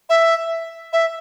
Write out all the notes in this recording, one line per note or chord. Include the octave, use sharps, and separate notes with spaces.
E5
E5